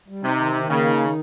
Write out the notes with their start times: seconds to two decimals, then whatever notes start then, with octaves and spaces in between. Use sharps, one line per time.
0.08 G3
0.23 C3 D#4
0.39 D#3
0.54 D#3
0.69 C#3 A#3
0.85 D#4
1.00 D#3